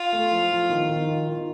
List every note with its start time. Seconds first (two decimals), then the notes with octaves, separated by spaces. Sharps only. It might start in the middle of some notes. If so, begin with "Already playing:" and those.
Already playing: F4
0.13 A3
0.31 F3
0.52 F3
0.70 D#3
0.89 D#3
1.08 F4
1.28 D#3